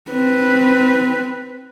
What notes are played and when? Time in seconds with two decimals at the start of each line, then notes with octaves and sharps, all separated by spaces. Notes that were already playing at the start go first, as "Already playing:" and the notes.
0.11 C4 B4